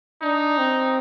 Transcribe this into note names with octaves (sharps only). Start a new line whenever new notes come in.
D4 D#4
C4